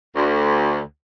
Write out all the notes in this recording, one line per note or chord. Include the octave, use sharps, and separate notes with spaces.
D2